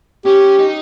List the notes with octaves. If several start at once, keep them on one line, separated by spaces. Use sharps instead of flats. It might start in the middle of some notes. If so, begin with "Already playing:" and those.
C#4 G4
D#4